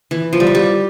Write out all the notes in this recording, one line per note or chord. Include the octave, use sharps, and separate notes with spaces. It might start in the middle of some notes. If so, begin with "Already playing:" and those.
E3
F3
G3
F3
G3